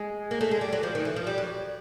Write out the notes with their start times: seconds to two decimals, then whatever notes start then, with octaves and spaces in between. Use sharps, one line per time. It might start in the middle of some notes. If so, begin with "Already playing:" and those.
Already playing: G#3
0.31 A#3
0.41 A3
0.51 G#3
0.61 G3
0.72 F#3
0.83 F3
0.95 D#3
1.05 E3
1.16 F3
1.27 G3
1.38 F#3